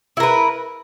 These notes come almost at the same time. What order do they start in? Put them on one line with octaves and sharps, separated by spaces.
E4 A#4 B4